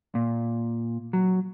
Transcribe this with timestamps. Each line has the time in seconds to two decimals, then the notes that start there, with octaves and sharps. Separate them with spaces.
0.15 A#2
1.13 F#3